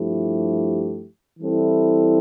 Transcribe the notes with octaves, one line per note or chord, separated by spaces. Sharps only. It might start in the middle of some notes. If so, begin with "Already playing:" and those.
Already playing: G2 F3 A3 E4 G4
E3 G3 C4 E4 A4